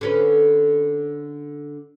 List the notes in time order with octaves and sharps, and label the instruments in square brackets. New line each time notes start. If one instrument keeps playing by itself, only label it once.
[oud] D3 C#4 B4